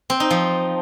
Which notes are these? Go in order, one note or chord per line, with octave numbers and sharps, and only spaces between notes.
C4
D#4
F3